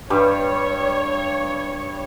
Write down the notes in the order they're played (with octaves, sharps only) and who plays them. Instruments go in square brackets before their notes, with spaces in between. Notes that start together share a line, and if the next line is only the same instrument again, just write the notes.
[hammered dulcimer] G2 G3 [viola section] C#5